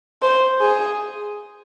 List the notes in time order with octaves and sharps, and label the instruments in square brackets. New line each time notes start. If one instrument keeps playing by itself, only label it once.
[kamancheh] C5
G#4